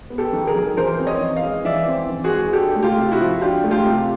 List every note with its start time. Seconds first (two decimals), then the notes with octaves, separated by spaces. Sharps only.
0.10 B3
0.18 G4 A4
0.33 D#3
0.47 G#4 A#4
0.54 F#3
0.77 E3 A#4 C5
0.99 C4
1.06 C#5 D#5
1.21 E3
1.36 D#5 F5
1.43 G#3
1.65 E3 D5 E5
1.87 C4
2.09 E3
2.24 F#4 G#4
2.32 G#3
2.53 D4 G4 A4
2.75 A3
2.83 F4 G4
2.97 C3 F4
3.12 E4 F#4
3.20 F3
3.41 D4 F4 G4
3.64 A3
3.71 F4 G4
3.86 C3